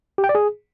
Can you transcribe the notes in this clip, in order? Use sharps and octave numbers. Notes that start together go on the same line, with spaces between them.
G4
G5
D5
G#4